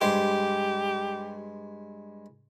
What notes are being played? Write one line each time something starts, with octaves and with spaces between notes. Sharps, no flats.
G2 G#3 G4 C5